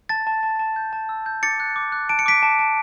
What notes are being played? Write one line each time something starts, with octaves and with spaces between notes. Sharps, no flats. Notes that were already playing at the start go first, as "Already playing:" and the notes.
A5 A6
A5
A5
A5
G6
A5
E6
G6
D6 A6 C#7
F#6
D6
F#6
A5 D7
C#7
D6 B6 D7
A5
A5